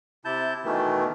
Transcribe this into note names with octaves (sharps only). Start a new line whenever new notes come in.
C3 E4 A5 G6
B2 D#3 E3 A3